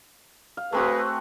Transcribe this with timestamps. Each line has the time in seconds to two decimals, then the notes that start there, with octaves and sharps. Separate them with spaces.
0.57 F5
0.73 A3 C4 F#4 G#4 B4